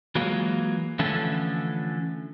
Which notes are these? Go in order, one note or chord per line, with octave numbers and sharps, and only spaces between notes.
E3 F#3 G#3 A#3 F4
D3 E3 F3 A3 C#4 A4